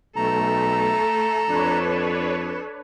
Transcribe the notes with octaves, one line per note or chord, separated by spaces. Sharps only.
B1 A3 A4 A#5
F2 D4 B4 C#5